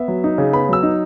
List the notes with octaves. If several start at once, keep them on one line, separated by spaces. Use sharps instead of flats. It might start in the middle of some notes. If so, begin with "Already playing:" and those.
Already playing: B3 E5
F#3
D#4
C#3
B3 B5
F#3 E6
D#4